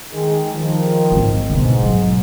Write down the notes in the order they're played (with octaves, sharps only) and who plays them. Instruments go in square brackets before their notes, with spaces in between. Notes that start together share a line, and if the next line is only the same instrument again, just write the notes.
[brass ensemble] D#3 G#3
D#3 F3
[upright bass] D1 G#1
[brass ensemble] G#2 [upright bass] B2 D3
[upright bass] G#1 F#3